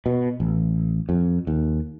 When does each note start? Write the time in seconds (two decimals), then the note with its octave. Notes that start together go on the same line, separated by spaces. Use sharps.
0.06 B2
0.40 A1
1.09 F2
1.47 D#2